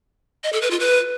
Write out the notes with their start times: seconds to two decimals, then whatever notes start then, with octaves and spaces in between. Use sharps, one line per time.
0.44 D#5
0.53 A4
0.62 B4
0.71 F4
0.80 B4